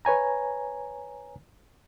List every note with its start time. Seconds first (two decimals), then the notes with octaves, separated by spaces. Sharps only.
0.05 B4 C#5 G#5 A#5